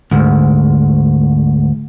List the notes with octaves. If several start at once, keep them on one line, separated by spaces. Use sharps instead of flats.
D2 G#2